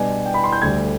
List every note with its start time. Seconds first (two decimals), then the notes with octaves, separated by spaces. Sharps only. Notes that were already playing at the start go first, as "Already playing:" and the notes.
Already playing: B2 G3 B3 D4 G#5
0.25 G5
0.34 B5
0.44 C6
0.53 G6
0.62 D2 D3 G3 G#6